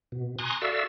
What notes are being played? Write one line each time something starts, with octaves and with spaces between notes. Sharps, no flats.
B2
G#5 A#5 C6 C#6 D#6 F#6
F#4 A4 D5 E5 F5 E6